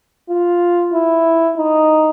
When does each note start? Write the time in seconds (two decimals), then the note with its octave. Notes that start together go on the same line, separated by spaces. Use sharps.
0.29 F4
0.94 E4
1.58 D#4